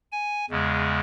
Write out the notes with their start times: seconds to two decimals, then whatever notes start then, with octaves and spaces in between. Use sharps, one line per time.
0.12 G#5
0.50 E2 C#3 G#3